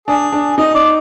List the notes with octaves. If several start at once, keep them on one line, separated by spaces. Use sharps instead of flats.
D4 G#4
D4
D#4 D#5
D5